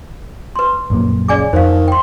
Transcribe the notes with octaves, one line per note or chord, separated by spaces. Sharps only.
B4 C6
A#1 F#2 A#3
C#3 D5 G#5 D6
F2 D#3 C5 F5
G5 C6